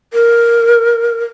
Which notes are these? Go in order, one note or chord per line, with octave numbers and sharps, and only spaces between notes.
A#4